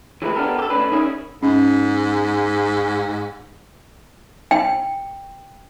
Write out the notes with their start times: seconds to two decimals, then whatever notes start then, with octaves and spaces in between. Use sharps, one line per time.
0.22 E3 F3 G#3 A3 C4 B4
0.36 B3 D4 F4 G4 A4 A#4
0.59 G4 A4
0.70 A2 D3 C#4 D4 B4
0.92 C#4 D#4 E4 G#4 A#4 C#5
1.43 G#2 C#4
4.51 G5